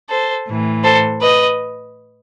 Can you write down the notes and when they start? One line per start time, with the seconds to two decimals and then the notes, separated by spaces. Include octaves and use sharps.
0.10 A4 C5
0.48 A2 E3
0.84 A4 C5
1.22 B4 D#5